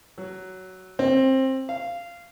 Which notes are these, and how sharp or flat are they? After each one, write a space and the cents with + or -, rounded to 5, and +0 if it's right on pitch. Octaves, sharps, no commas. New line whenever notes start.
F#3 +10
C4 +20
F5 -15